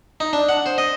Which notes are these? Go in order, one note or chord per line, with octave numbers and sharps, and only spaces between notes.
D#4
D4
F#5
C5
D#5